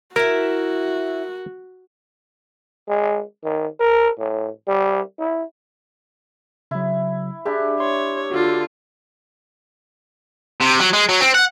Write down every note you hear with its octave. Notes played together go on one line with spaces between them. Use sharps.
E4 F#4 A#4 E5
G#3
D#3
A#4
A2
G3
E4
C#3 F#3 E4
D4 E4 G4 G#4
C#5 C6
D3 F4 F#4
C3
F#3
G#3
F#3
C4
F#5